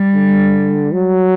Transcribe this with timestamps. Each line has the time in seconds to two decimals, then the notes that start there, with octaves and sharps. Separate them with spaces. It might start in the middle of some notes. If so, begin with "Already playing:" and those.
Already playing: G3
0.14 D3
0.93 F#3